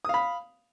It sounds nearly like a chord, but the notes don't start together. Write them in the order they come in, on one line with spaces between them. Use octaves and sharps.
D#6 F5 B5